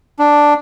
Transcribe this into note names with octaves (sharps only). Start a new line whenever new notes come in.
D4